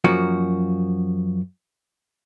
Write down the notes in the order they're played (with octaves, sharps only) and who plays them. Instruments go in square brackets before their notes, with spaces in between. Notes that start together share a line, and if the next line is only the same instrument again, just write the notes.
[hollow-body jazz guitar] F#2 F3 A#3 F#4